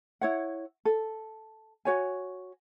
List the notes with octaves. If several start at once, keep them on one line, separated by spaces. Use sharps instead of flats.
E4 C#5 F#5
A4
F#4 C#5 G#5